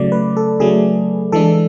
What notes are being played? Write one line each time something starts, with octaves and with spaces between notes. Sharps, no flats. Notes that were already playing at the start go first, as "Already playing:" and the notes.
Already playing: C#3 F#3 A3 D5
B4
A4
C#3 F#3 A3 G#4
E3 G#3 D4 A4